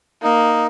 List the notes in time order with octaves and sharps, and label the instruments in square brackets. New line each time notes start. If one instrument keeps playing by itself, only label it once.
[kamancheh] A#3 [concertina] D#4